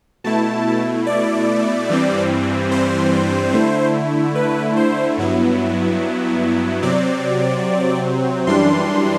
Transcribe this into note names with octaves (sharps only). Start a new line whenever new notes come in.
B2 A3 E4 A5
D5
G2 E3 G3 C4
C5
D3 A3 E4
B4
C5
G2 F#3 B3 E4
C3 F#3 C4 D5
F#2 E3 G3 D4 C6